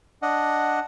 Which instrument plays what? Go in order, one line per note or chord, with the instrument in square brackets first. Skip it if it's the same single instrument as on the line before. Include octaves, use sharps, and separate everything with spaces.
[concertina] D4 D#5 F#5